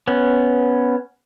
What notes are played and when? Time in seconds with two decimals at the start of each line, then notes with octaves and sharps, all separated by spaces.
0.07 B3 C#4